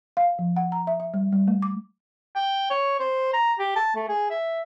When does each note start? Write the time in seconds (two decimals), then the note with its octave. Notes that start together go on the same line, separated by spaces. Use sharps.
0.17 F5
0.39 F3
0.56 F#5
0.72 A#5
0.87 E5
1.00 E5
1.14 G3
1.32 G3
1.48 A3
1.62 D6
2.35 G5
2.70 C#5
3.00 C5
3.33 A#5
3.59 G4
3.76 A5
3.96 A3
4.09 G#4
4.30 E5